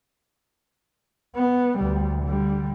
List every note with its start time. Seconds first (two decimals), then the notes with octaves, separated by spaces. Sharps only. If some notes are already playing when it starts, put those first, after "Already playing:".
1.35 B3
1.79 D2 G3
2.23 D3 G3